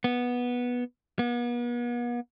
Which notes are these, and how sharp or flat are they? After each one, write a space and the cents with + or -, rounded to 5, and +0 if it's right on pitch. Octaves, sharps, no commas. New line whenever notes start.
B3 -10
B3 -40